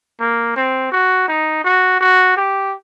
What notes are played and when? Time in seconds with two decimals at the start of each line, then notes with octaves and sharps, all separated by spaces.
0.20 A#3
0.56 C4
0.92 F#4
1.28 D#4
1.64 F#4
2.00 F#4
2.37 G4